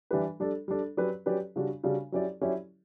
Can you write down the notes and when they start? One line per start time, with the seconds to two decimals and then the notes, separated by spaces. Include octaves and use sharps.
0.11 E3 G3 D4 G4 B4
0.40 G3 D4 A4
0.68 G3 D4 A4
0.97 F#3 C#4 G4 B4 D5
1.26 F#3 C#4 G4 B4 D5
1.56 C#3 G3 D4 F#4
1.83 C#3 G3 D4 F#4
2.12 F#3 C#4 E4 G4 D5
2.41 F#3 C#4 E4 G4 D5